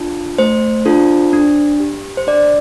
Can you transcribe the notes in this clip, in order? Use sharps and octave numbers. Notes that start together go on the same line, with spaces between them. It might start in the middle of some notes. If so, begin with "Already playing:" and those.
Already playing: D4 F4 A4
A3 C5
D4 F4 A4
D4
G4
C5
D4 D5